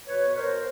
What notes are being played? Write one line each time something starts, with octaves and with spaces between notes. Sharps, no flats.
B2 B4 C#5
B2
B4
A#4 C5
B2